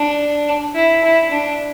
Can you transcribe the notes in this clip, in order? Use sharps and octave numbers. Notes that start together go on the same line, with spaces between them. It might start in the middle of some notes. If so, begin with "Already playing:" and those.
Already playing: D4
E4
E4
D4